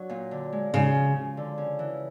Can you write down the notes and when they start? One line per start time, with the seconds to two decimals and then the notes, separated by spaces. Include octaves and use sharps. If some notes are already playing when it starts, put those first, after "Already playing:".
Already playing: F#3 D4
0.09 A#2
0.31 D3
0.52 G#3
0.73 C#3 G#3
0.95 F3
1.16 F3
1.37 D3
1.58 C#3
1.79 E3